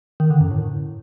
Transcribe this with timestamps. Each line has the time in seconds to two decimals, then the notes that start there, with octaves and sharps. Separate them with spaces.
0.20 D#3
0.30 D3
0.41 F#2
0.51 A2